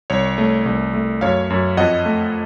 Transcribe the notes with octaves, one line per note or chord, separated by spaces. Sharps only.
C2 C#5
A3
C2
A3
F#2 C#5 F5
F#2
F2 D#5 F#5
A3